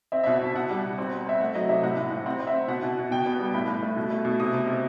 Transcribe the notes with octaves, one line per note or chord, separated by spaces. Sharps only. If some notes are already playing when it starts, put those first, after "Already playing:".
C4 E5
B2 E5
F#5
B2 A5
B2 F#5
G3
B2
C4
C4
C4 E5
A3 F#5
F#3 D#5
C3 E5
A2 F#5
A2
A2
C4 F#5
C4
E5
C4
B2 F#5
B2
B2
B2 G5
B3
G3
A2 B5
A2
A3
B2
A3
B2
C3 D#6
C3
C3